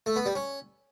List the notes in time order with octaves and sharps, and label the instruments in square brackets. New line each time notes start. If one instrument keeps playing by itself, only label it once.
[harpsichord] A3
B3
G3
C#4